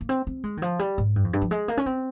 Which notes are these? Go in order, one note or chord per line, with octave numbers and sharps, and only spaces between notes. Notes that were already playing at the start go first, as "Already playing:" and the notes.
A#3
C4
C4
G#3
D#3
F3
G3
G#2
G2
F2
G2
F3
G#3
A#3
C#4
C4